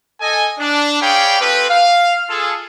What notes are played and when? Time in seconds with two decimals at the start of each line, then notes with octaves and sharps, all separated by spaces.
0.21 A4 D#5 G#5
0.60 D4
1.02 G#4 C#5 D5 F5 G5 B5
1.41 C4 F4 G4 A4 B4
1.70 F5
2.29 F4 G#4 A4